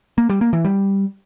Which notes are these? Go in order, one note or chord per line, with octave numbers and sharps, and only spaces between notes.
A#3
G3
A#3
E3
G3